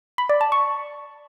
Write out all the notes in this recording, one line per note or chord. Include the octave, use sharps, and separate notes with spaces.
B5
D5
A5
C#6